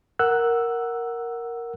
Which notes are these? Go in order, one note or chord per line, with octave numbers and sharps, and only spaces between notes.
A#4 F#5 E6 F#6